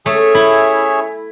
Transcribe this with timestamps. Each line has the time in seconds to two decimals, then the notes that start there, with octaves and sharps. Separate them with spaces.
0.06 A3 C#4 G#4 C#5 E5
0.35 E4